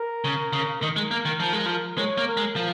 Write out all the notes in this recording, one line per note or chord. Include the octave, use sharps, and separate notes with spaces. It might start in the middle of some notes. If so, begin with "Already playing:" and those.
Already playing: A#4
C#3
C#3
D#3 A#4
G#3
A#3
D#3
F3
G#3
F3
G#3 C#5
A#3
A#4
G#3
F3